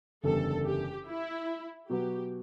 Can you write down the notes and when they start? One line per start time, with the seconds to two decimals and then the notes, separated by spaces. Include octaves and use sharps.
0.24 F#1 E2 D3 G3 A4
0.65 G4
1.07 E4
1.89 B2 F#3 B3 F#4 G4